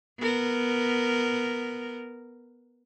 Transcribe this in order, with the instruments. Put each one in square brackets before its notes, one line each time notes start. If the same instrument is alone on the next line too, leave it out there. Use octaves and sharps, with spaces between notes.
[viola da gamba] B3 A#4